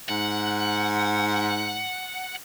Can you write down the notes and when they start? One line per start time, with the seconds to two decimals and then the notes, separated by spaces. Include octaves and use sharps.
0.09 G#2 F#5